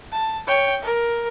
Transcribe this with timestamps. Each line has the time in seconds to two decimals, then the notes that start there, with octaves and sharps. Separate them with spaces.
0.12 A5
0.47 C#5 G5
0.82 A#4